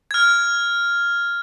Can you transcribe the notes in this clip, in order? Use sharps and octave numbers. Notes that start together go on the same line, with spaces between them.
F6 G#6